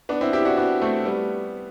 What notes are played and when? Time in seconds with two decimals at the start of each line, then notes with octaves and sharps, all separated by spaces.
0.09 B3 D4
0.21 C4 E4
0.33 E4 G4
0.45 D4 F#4
0.57 B3 D4
0.82 A3 C4
1.05 G3 B3